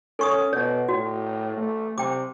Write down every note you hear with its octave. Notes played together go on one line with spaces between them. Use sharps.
C#4 A4 C#6 D#6
B2 C#5
A2 F#4
A3
C3 G5 D6